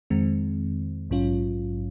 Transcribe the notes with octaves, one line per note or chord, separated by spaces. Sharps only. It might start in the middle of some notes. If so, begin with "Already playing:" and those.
F2 D#3 G#3 C4
A#1 G#2 F#3 C#4 F4